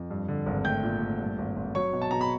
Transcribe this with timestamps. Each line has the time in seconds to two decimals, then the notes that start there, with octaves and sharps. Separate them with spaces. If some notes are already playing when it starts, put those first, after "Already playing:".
Already playing: F2
0.10 G2
0.28 D3
0.46 G#1
0.64 A3 G5 G6
0.83 A#2
1.02 A3
1.20 G2
1.38 G#1
1.56 G#1
1.75 F#3 C#5 C#6
1.93 B2
2.02 A5
2.11 B2 A#5
2.21 B5